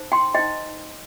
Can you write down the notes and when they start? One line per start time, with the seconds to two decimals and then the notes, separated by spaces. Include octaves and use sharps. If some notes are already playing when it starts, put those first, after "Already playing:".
Already playing: D#4 C5
0.12 G5 C6
0.34 D#4 C5 D#5 G5